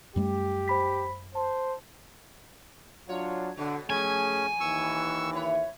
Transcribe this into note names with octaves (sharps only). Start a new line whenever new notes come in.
F#2 G3 A3 G4
C5 B5 B6
C5 A5
F#3 D4 F4 C#5
B2 D3 F#4
B2 F3 A3 C#4 G#4 G#5
D#2 D#3 E3 C#6 E6
E4 B4 C#5